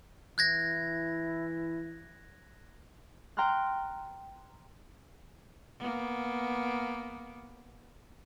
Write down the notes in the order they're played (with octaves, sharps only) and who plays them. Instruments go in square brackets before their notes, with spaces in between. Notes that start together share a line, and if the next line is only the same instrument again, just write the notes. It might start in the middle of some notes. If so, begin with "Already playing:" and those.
[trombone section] E3 E4 [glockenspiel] F#6 G#6 A#6
[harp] G5 A#5 C6 F6 F#6
[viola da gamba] A#3 B3